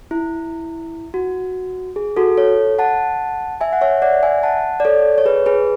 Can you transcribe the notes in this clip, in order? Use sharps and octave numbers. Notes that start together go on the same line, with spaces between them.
E4
F#4
G#4
F#4 A4
A4 C#5
F#5 A5
E5 G#5
F#5
C#5 E5
D5 F#5
E5 G#5
F#5 A5
D5
A4 C#5
C#5
G#4 B4
G#4 B4